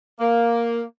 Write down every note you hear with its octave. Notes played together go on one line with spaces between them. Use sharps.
A#3